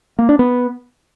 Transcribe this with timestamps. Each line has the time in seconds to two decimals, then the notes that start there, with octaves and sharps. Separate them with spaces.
0.19 A#3
0.29 D4
0.39 B3